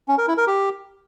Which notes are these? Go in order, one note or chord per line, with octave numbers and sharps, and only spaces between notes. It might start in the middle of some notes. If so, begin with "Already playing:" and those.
C#4
A#4
E4
A#4
G4